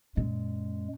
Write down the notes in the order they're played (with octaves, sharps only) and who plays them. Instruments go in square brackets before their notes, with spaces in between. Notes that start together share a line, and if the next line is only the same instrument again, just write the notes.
[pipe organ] F#2 G#3 [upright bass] A#2